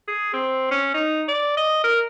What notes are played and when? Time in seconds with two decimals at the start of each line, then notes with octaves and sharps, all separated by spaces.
0.08 G#4
0.33 C4
0.71 C#4
0.94 D#4
1.28 D5
1.57 D#5
1.84 A#4